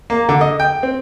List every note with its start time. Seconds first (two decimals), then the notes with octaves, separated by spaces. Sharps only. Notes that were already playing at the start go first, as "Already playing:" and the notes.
0.10 A#3
0.29 D3
0.41 D#5
0.60 G5
0.83 C4